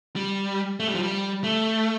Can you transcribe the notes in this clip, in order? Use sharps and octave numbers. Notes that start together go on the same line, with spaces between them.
G3
A3
G3
F3
G3
A3